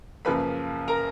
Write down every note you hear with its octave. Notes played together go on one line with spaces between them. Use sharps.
F#2 C#3 F3 A#3 B4 B5
A#4 A#5